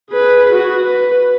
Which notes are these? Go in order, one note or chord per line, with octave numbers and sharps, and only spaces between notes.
G#4 B4
F#4
B4